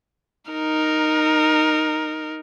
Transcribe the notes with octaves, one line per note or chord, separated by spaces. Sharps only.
D#4 A#4